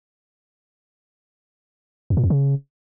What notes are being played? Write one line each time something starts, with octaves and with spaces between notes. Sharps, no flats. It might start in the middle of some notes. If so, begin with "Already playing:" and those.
F2
A#2
F2
C#3